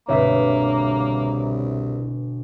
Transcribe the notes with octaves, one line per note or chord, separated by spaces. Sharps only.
G1 C2 B2 A#3 C#5 E5 B6